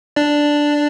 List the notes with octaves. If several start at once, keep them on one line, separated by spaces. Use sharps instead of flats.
D4 D5